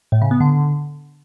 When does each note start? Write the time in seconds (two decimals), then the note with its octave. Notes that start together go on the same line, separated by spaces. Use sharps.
0.12 A2
0.22 C#3
0.31 B3
0.40 D3